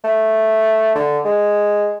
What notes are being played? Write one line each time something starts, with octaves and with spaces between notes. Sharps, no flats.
A3
D3
G#3